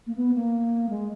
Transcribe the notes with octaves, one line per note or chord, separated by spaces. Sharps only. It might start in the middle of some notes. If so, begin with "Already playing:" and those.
A#3
B3
A#3
G#3